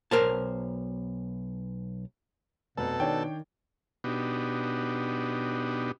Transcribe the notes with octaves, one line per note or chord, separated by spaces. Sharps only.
B1 A#4 C5 A5
F1 B2 A4
D#3 D4 C#5 G5
B2 B3 D4 D#4 F#4 G4